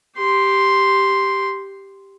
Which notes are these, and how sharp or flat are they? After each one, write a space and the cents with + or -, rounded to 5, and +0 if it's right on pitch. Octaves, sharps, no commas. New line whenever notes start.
G4 +0 C6 +0